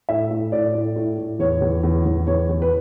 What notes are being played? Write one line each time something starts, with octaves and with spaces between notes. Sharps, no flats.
A2 E5
A2
A2 D5
A2
A2
A2
E2 C#5
E2
E2
E2
E2 C#5
E2
B4